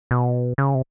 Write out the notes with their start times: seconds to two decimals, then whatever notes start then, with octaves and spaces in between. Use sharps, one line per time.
0.11 B2
0.58 C#3
0.75 C3